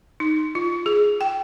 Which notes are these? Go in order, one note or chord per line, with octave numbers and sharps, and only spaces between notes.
D#4
F4
G#4
G5